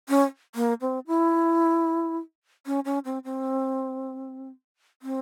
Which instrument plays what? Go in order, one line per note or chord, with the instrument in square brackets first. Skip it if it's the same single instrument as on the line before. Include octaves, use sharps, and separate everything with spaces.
[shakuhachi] C#4
A#3
C4
E4
C#4
C#4
C4
C4
C4